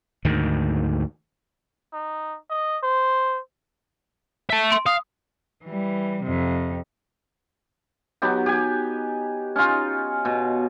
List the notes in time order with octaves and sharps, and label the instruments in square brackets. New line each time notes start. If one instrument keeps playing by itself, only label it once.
[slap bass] D2 G#2 D#3
[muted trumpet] D#4
D#5
C5
[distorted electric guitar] E5 A5
[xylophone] C6 D7
[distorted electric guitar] F5 [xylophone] D#6
[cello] E3 G3
F2 C3
[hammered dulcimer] F#3 B3 D#4 G4
G4 G#5
C#4 D#4 F4
B2